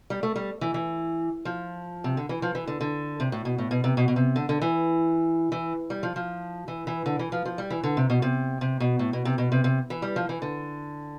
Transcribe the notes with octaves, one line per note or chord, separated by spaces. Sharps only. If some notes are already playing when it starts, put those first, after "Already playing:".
G3
A3
G3
E3
E3
F3
C3
D3
E3
F3
E3
D3
D3
C3
A2
B2
A2
B2
C3
B2
B2
C3
D3
D3
E3
E3
G3
F3
F3
E3
E3
D3
E3
F3
F3
G3
E3
D3
C3
B2
C3
C3
B2
A2
B2
C3
B2
C3
C3
E3
G3
F3
E3
D3